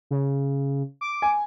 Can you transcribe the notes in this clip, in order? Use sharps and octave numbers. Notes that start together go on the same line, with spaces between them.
C#3
D6
G#5